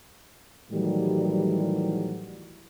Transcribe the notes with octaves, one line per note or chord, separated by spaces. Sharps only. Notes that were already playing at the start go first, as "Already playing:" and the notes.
A2 D#3 E3 F#3 G3